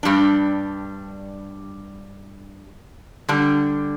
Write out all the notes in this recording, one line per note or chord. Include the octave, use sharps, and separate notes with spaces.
G2 G3 D4
D3 G3 D4